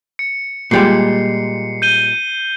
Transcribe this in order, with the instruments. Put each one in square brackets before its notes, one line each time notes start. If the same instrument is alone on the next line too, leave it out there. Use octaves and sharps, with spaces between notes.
[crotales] C#7
[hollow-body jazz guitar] A#2 G3 G#3 [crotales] C7 C#7
[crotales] G6 D#7 G7